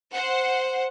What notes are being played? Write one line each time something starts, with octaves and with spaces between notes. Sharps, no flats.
C5 F#5